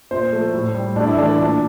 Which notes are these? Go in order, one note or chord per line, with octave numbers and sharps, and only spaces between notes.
A#2 C5
F3 A3
A2
G3
A2 D4
E4
E3 A3 D4
A#2 D4